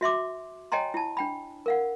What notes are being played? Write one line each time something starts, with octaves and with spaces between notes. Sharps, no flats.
F#4 E5 C6 D6
C#5 D#5 G5 G#5 A#5 C6
E4 A5
D4 G5 B5
A#4 F5 F#5